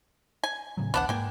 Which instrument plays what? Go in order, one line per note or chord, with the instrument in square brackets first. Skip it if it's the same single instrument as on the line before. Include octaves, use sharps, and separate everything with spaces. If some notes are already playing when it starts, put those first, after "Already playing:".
[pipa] G#5
[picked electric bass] A2 C#3 F#3
[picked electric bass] A#1 D#2 [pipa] B3 D4 F#5
[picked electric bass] G#2 A#3 [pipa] G5 G#5